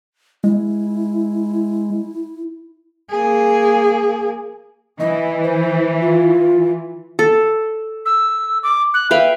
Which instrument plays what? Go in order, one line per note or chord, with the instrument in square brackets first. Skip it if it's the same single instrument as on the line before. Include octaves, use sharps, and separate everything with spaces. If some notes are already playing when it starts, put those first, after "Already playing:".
[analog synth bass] G#3 [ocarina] E4
[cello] A#3 G#4
[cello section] E3 [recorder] D#5
[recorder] C5
F4
[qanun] A4
[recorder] E6
D6
F#6
[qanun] B4 F5 G5 [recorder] E5